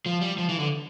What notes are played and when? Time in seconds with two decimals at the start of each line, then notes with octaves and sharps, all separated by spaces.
0.06 F3
0.21 G3
0.38 F3
0.49 E3
0.60 D3